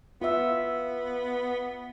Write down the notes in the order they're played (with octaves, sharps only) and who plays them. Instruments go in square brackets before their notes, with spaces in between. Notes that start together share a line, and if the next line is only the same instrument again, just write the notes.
[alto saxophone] B3 [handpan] F4 E5